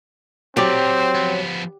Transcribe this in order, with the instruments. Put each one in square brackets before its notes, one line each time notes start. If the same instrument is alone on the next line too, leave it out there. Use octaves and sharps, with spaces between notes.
[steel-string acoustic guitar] F#3 [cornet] C4 [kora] G4 D5 G5 [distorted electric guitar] C5 A#5
[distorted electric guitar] F3 B3